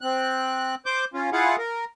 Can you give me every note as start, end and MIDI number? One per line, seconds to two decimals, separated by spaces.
0.01 0.75 60
0.01 0.75 90
0.86 1.05 72
0.86 1.05 86
0.86 1.05 91
1.14 1.30 61
1.14 1.30 65
1.33 1.56 64
1.33 1.56 65
1.33 1.56 68
1.33 1.56 77
1.33 1.56 78
1.58 1.85 70